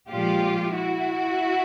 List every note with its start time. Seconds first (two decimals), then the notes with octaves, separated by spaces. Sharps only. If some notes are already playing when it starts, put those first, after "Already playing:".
0.10 A#2 F3 G#3 F4 G4
0.74 E4 F#4